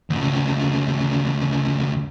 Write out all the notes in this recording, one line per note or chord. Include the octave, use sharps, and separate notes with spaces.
D2 C#3